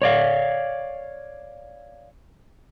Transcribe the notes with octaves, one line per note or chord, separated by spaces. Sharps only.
C#5 D5 F5